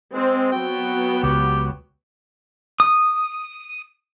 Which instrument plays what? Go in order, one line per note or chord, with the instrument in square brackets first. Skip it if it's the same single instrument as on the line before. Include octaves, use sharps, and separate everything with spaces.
[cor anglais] G#3 [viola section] C4
[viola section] F#3 B3 F#4 [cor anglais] G5
[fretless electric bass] C#2 [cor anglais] G4
[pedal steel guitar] D#6